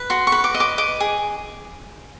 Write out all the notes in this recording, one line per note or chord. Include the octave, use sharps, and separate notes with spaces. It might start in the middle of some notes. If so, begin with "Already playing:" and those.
Already playing: B4
F#4 C6
C#6
B4
D6
D#5
D6
D#5 D6
G#4